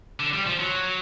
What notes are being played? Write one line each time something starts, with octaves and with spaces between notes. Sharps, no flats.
D3
G3
F3
F#3